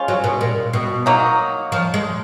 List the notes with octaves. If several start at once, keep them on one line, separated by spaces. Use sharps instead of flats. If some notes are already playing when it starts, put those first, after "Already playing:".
Already playing: F3 G#3 C#4 F4
F#3
B2
A#2
B2
F#3 A#3 D#4
F3
G#3